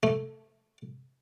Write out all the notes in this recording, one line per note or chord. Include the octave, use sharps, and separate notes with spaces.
A3